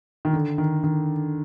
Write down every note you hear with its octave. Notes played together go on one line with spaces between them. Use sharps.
D#3
D3
D#3
D#3